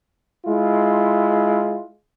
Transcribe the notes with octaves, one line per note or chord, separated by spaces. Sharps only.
G#3 E4 F4